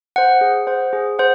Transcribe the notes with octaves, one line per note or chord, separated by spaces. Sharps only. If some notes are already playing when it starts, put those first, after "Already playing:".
C5 F#5
G#4
C5 F#5
G#4
C5 F#5